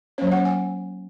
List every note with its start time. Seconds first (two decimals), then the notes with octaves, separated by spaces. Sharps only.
0.18 F#3 A#3 C#4 C#5
0.32 F#5
0.45 G#5